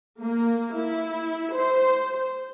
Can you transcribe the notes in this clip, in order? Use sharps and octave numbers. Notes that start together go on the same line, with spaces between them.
A#3
E4
C5